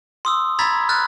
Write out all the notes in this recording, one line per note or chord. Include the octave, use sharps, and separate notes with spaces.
C6 D#6 E6
A#5 B5 E6 G#6 A6 B6
F6 F#6 A6